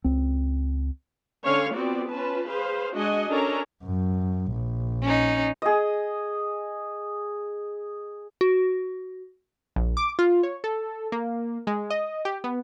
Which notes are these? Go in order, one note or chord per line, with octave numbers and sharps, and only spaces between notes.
C#2 C4
D3 C#4 C#5 F5
B3 C4 F4 F#4 D5
C#4 F4 B4 A5
G#4 B4 C5 F5
G#3 D4 F#4 D#5 F#5 G#5
C#4 D4 A4 A#4 C#5 A#5
F#2
A#1
C#4 D#4
G#4 D#5
F#4
A#1
D6
F4
C#5
A4
A#3
G#3
D#5
G4
B3